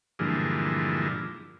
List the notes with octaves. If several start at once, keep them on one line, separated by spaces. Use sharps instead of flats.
G2 A#2 D3 E3 F3 G#3